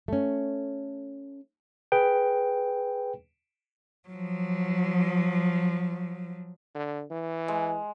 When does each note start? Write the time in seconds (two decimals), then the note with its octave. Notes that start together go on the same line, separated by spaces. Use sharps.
0.08 A3 C#4
1.92 G#4 B4 G5
4.09 F3 F#3
6.75 D3
7.11 E3
7.48 G#3